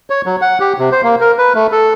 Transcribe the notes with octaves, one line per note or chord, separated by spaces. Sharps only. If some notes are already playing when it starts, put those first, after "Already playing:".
C#5
F#3
F#5
G4
C3
C5
A#3
A#4
B4
A3
A4